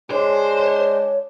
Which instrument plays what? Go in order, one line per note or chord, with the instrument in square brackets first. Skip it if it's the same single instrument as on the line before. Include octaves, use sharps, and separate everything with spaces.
[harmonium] G#3 D4 [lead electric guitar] C5 [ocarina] C#5